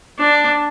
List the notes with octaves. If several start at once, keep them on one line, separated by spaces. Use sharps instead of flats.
D4